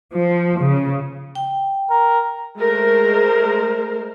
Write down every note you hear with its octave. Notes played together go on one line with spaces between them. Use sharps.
F3
C#3
G5
A#4
G#3 A3 A#4 C5